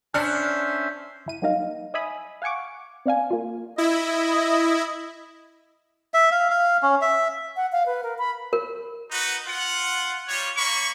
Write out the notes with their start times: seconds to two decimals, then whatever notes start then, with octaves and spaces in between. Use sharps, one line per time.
0.14 C#4 D4 C5 E5 F6 F#6 C#7
1.26 G1 E4 D#7
1.42 F#3 G3 A#3 D#4 D#5 F5
1.94 D#5 E5 G#5 B5 D#6
2.42 F5 F#5 G#5 C#6 D6
3.06 C4 D5 F5 G#5
3.31 A#3 F4
3.78 E4 D#5
6.14 E5
6.31 F5
6.50 F5
6.83 C#4
7.01 E5
7.56 F#5
7.72 F5
7.86 B4
8.03 A#4
8.18 B5
8.53 A#4
9.11 D#4 F#4 B4
9.46 F4 F#5
10.28 G3 F4 C#5
10.57 A#3 C#5 B5 C#6